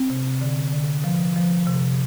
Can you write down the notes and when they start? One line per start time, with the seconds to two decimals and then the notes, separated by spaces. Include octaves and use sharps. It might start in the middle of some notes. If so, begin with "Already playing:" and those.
Already playing: C4
0.10 C3
0.41 D3
0.73 D3
1.04 F3
1.36 F3
1.67 C3